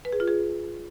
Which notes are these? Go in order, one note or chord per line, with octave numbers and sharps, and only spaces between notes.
B4
G#4
F4
G#4